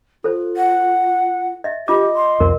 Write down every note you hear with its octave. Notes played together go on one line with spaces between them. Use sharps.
F4 A4 C5
F#5
D#5 E5
F4 G4 D#5 D6
C6
C2 F2 A#4